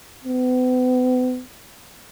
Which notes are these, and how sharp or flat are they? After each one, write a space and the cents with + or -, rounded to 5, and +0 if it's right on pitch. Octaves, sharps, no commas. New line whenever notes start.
B3 +40